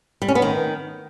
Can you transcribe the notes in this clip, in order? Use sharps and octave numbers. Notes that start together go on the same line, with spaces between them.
G3
C#4
B3
D#3